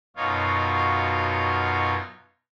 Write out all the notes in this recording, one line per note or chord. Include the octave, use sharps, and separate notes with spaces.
F#2 B2 D#4 F4 C#5 F5